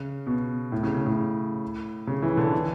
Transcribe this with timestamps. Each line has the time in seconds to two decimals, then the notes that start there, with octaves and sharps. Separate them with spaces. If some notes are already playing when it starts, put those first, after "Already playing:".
Already playing: C#3
0.27 B2
0.72 A2
0.83 C#3
0.95 C#3
1.06 A2
2.07 C#3
2.22 E3
2.37 D3
2.52 E3